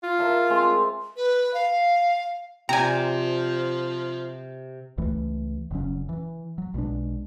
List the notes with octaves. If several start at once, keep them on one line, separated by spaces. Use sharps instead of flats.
F4
A#4 E5 A5
G#3 C4
B4
F5
C3 F3 D5 G5 G#5 A#5
C#2 E3 A3
F1 C#3 F#3 C#4
E3
F#3
B1 B2 G#3 D4